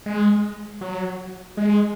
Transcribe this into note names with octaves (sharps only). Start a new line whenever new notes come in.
G#3
F#3
G#3